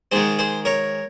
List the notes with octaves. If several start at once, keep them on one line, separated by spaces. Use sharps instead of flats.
G#2 D#3 G#3 G#4 C5
G#4 C5
A#4 C#5